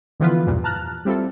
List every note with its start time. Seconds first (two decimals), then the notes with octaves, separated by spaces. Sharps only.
0.20 D3 E3 F3 B3 F4 B4
0.47 B1 E2 G2 A#2
0.64 A5 A#5 F6 F#6
1.05 G3 C4 E4 F4 A4